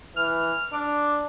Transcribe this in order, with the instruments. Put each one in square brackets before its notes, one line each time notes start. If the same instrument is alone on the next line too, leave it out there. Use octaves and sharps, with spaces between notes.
[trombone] E3 [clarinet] F6
[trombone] D4 [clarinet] D6